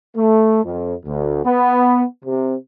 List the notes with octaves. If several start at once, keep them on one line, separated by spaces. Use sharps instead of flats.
A3
F2
D2
B3
C3